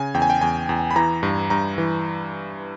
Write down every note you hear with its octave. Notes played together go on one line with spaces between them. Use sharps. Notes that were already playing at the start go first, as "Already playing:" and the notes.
Already playing: C#3 G#5
E2 G5
G#5
G5
E2 G#5
E2
B5
E3 A#5
G2
G2 A#5
E3